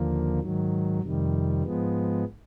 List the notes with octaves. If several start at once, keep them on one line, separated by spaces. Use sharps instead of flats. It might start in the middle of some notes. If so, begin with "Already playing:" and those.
Already playing: D#2 D3 F3 A#3
G#2 D#3 F#3
F2 C3 D#3 G3
G#2 F3 G#3 B3